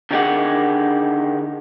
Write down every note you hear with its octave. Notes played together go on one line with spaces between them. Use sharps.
D3 D#3 D#4 G4 G#4 F#5